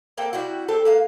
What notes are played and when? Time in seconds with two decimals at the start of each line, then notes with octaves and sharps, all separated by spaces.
0.18 A#3 C4 A4 G5
0.33 C3 G3 E4 F#4
0.68 G3 C4 G4 A4
0.85 A#3 B4 F5